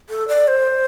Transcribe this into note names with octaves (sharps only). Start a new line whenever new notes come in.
A4
D5
C5